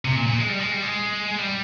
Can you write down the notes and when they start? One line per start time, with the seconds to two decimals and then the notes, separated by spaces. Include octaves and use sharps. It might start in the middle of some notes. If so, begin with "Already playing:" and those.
0.05 C3
0.16 A#2
0.27 A#2
0.38 G#3
0.49 G3
0.60 G#3
0.72 G3
0.82 G#3
1.38 G3